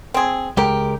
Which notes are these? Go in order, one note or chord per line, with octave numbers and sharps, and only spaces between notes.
C4 G#4
C#2 G#3 G4 A#4